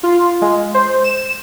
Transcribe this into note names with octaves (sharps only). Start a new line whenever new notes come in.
F4
G#3
C5
E7